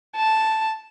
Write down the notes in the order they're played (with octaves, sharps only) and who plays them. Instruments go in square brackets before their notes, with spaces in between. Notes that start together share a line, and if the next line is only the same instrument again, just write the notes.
[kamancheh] A5